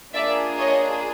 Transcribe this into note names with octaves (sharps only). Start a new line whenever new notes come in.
A#3 D4 F4 G#4 D5 E5
C#5 D#5